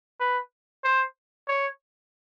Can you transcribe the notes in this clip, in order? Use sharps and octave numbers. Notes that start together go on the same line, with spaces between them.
B4
C5
C#5